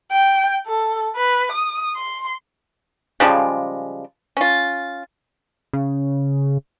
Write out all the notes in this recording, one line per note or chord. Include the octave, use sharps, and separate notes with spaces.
G5
A4
B4
D#6
C6
C#3 F3 G3 G#3
C#4 F4
C#3